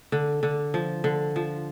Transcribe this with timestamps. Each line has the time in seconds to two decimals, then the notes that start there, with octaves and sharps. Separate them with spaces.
0.12 D3
0.43 D3
0.74 F3
1.04 D3
1.36 F3